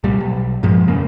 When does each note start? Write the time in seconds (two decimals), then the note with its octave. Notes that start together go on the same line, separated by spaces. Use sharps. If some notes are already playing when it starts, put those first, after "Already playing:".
0.04 C2 A#2 G3
0.20 B1
0.63 G2 A#2 F3 G#3
0.88 F2 C#3 A#3